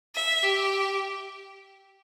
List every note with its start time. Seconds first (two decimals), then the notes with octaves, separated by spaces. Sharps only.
0.15 E5
0.43 G4